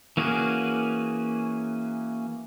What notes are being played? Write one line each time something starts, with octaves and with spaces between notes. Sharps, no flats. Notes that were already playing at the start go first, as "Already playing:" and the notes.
E3 A#3 C#4 F#4 G#4